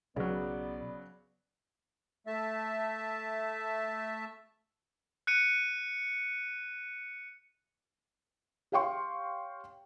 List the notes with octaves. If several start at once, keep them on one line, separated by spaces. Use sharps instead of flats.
B1 C#3 F#3 B3 D5
A3 E5 A5
F#6 C#7 D#7
G4 C#5 F5 G5 C6 C#6